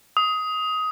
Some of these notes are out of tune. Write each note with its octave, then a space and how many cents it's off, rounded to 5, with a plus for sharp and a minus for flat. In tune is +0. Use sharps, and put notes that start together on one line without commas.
D#6 +15